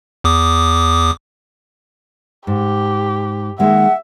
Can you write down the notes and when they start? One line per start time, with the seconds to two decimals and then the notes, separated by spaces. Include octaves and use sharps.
0.24 E2 D6 D#6
2.47 G#2 G4
3.59 D#3 G#3 A#3 E5 F#5